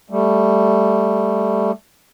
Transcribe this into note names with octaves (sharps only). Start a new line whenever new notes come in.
G3 A3